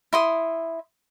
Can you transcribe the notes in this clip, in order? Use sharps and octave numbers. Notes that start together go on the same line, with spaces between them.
E4 C6 D#6